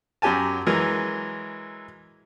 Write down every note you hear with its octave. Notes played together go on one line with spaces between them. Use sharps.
F#2 F#3 G4 G#5 A5
E3 F#3 G#3 A#4